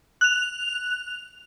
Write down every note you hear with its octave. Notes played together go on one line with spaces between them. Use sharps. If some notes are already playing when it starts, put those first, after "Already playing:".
F#6 F7